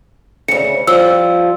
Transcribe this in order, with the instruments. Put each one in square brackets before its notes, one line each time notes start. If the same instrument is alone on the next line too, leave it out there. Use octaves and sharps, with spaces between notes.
[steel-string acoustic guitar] D2 C#3 [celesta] C#7
[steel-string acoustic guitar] F3 G3 F4 [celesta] E6